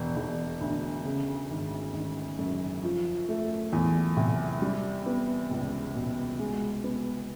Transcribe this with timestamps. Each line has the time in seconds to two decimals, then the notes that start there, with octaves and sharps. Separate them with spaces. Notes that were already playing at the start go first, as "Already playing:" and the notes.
Already playing: E1
0.16 E1
0.61 D2
1.05 C#3
1.50 G#1
1.94 G#1
2.39 F#2
2.83 F3
3.29 A3
3.73 E2
4.17 C3
4.62 G3
5.06 B3
5.51 C#2
5.95 B2
6.39 G#3
6.84 B3